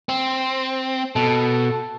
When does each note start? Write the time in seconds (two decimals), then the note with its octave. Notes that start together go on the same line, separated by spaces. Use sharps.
0.09 C4
1.16 B2 A4